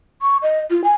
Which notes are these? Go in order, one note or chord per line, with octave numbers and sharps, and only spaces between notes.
C#6
D#5
F4
G#5